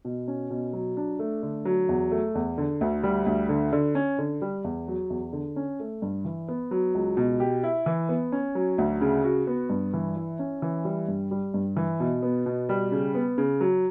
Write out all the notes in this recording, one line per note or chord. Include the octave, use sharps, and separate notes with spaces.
B2
C#4
B2
F#3
D4
A3
D3
F#3
E2
A3
E2
D3
D2
G3
D2
D3
D3
C#4
D3
G3
E2
F#3
E2
D3
C#4
A3
G2
E3
B3
F#3
C#2
B2
G4
E4
E3
B3
C#4
F#3
D2
C#3
F#4
B3
G2
E3
E4
C#4
E3
G3
G2
G3
G2
E3
B2
B3
B2
G3
C#3
B3
C#3
F#3